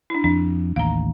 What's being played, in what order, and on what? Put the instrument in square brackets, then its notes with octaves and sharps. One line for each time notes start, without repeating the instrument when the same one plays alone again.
[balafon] D4 E4
[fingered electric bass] F2 [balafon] D4
[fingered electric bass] A1 D#2 [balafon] F5 A#5